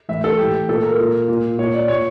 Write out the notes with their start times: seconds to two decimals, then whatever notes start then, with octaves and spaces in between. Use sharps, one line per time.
0.08 A2 E3 E5
0.24 A4
0.38 A2 E3 G4
0.68 A#2 A4
0.83 A#4
0.99 A#2
1.28 A#2
1.58 A#2 C#5
1.74 D5
1.88 A#2 C#5